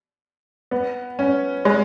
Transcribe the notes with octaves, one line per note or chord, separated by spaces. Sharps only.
B3
C#4
G#3